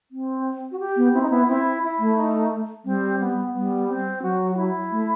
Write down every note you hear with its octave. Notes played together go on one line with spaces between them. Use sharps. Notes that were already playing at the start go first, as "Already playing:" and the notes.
C4
F#4
G4
B3
C4 E4
D#4
B3 E4
C4 E4
E4
A3
D#4
G3 C4
B3
G3 B3
C4
F#3 F#4
F#4
E4
A3